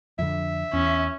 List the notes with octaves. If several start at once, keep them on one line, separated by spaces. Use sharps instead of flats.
F2 D3 E5
E2 C#4